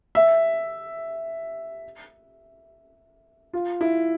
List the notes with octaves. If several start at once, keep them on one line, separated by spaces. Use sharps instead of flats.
E5
F4
E4